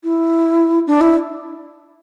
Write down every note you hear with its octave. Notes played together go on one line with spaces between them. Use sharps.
E4
D4
E4